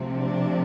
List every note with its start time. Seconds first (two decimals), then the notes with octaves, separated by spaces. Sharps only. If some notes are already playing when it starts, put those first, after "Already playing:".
Already playing: C3 F3 A3 C4
0.16 D4